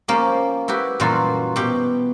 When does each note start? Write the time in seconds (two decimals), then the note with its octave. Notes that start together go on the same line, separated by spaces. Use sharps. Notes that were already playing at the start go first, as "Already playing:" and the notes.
0.08 F3 A#3 C#4 G4
0.68 E4 F#4 G4 B4
1.00 F#2 A#2 E3 G3 F4 F#4
1.56 B2 G4